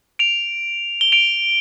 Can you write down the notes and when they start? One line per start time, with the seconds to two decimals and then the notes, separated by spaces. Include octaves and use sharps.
0.19 D7 F7
1.01 G7
1.12 D7 F7